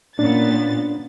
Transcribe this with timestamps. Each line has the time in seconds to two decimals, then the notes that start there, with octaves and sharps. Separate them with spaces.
0.19 A#2 B3 C#4 D4 A6